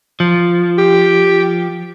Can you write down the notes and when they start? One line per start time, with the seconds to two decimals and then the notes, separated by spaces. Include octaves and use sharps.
0.20 F3
0.78 G4